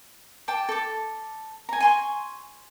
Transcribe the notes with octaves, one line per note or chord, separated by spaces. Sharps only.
G5 A5 D6
A4 D6
G#5 A#5
G#5 C6 C#6